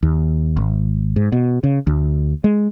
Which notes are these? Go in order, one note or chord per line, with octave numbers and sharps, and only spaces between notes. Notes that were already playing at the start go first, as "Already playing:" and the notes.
D#2
G#1
G#2
B2
C#3
D2
G#3